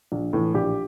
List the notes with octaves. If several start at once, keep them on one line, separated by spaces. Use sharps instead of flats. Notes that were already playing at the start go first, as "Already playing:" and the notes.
A#1
A2 E3
A#1 G4